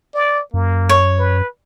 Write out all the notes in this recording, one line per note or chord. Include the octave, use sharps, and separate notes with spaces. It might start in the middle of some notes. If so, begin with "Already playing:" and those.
D5
F#2 A#3
C#5
B4